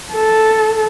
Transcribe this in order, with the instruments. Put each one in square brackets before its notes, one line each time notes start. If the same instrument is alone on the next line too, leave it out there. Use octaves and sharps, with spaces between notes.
[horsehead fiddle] A4